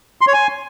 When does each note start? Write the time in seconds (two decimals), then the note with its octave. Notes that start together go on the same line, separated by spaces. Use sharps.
0.21 C6
0.27 C#5
0.34 G#5